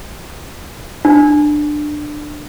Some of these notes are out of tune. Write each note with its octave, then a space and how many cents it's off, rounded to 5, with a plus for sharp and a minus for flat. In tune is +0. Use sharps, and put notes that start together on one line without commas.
D4 +20